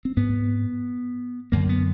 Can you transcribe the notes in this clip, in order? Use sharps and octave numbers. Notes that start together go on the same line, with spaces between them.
C4
G#2 B3
F#2 D3 A#3
B3